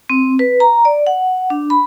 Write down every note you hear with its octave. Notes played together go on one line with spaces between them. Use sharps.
C4
B4
A#5
D5
F#5
D4
B5